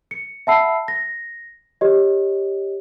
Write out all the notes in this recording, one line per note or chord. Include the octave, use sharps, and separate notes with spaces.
C#7
E5 F#5 A5 B5 E6 C7
A#6
G4 C#5 D#5